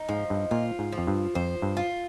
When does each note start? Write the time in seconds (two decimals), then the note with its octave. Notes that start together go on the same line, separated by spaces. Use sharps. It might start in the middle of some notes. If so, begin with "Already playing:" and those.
Already playing: D#4
0.09 G#2 F3
0.30 G2
0.51 A#2 F4
0.79 G#2
0.92 F3
0.98 F2
1.07 G2
1.35 F2 C5
1.62 G2
1.77 F4